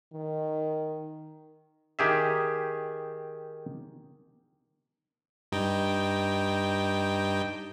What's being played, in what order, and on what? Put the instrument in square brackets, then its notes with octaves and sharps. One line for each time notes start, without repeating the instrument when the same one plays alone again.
[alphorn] D#3
[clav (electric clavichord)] D#3 G4 G#4 E5
[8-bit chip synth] G2 D#4 G5